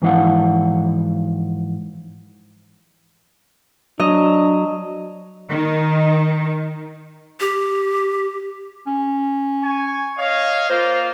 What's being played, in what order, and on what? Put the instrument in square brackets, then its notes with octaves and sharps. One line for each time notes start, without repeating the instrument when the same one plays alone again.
[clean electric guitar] G#2 E3 F3 E4 F5 F#5
[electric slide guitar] F#3 [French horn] D4 [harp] D#5
[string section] D#3
[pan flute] G4
[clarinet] C#4
[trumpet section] G#5 C#6
C#5 D#5 F5
[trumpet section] A#3 F4 [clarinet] C5